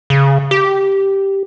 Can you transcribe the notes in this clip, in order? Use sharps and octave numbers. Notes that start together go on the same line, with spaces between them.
C#3
G4